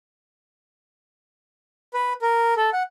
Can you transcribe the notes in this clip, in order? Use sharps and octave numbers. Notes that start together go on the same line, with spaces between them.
B4
A#4
A4
F#5